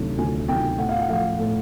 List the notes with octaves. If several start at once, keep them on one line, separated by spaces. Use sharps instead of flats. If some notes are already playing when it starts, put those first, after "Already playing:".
Already playing: D2 C3 D#3 F#3
D2 G#5
C3 D#3 F#3 G5
A2 F#5
F5
F#5
F3 A3 F5
A2